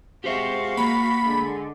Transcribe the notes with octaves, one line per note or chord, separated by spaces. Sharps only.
G#3 F#4 G4 C5 E5 F5
A#3 B5
D3 G#3